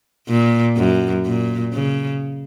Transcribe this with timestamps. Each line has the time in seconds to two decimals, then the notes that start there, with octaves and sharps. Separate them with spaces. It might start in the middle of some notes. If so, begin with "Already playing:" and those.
0.28 A#2
0.77 F#2
1.26 A#2
1.74 C#3